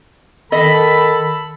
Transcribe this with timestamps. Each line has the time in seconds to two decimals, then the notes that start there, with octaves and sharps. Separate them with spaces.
0.52 D#3 A4 D#5 B5